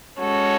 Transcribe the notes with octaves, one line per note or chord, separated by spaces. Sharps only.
G#3 C#4 F#4 A4 C#5